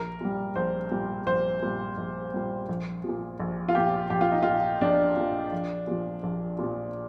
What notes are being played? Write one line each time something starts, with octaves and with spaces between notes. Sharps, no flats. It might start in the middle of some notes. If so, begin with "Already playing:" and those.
Already playing: A#1 A#4
A#2 G3
A#1 C5
A#2 G3
A#1 C5
A#2 G3
A#1
A#2 G3
A#1
A#2 F3
A#1
F4
A#2 F3 G4
A#1 G4
F4
D#4
A#2 F3 F4
A#1 D4
A#2 F3
A#1
A#2 F3
A#1
A#2 F3